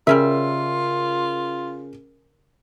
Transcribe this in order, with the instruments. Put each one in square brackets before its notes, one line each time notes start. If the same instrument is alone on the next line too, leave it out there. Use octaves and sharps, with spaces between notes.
[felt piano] C#3 A#4 [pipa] G3 C#4 E5 [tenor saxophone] F4